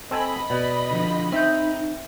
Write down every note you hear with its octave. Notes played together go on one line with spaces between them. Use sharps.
C4 A4 D#5 G#5 B5
B2 D5
D3 F3
C4 D#4 E5 G6